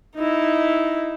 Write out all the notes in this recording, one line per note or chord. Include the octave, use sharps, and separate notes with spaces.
D#4 E4